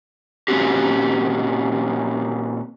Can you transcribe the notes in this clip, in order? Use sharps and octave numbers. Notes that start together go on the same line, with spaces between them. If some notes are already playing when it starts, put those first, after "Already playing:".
A#2 F#3 C4 C#4 F#4 G4